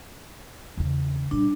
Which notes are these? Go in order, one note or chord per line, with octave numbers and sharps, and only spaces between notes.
E2 C#3
A#2 G3 D4